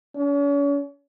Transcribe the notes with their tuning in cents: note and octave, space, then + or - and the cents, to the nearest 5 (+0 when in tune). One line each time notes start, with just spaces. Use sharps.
C#4 +40